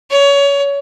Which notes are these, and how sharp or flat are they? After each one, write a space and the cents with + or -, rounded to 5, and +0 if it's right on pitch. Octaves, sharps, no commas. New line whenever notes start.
C#5 +25